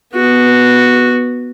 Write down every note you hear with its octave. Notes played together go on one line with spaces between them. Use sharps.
B3 F#4